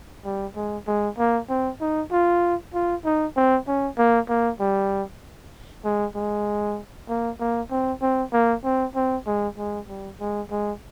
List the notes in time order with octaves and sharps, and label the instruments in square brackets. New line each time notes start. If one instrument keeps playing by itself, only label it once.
[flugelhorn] G3
G#3
G#3
A#3
C4
D#4
F4
F4
D#4
C4
C#4
A#3
A#3
G3
G#3
G#3
A#3
A#3
C4
C4
A#3
C4
C4
G#3
G#3
G3
G#3
G#3